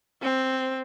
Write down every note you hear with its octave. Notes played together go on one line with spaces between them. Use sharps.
C4